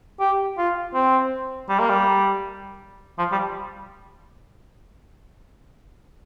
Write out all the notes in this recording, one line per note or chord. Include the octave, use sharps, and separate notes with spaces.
G4
F4
C4
G3
A#3
G3
F3
G3